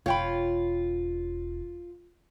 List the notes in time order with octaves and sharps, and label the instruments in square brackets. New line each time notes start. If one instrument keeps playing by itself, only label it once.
[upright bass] E1 [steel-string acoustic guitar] F4 [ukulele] C#5 G5 B5